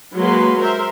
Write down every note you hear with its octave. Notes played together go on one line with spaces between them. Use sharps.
F#3 G#3 A#3 B4 C6
A#4 C5 E5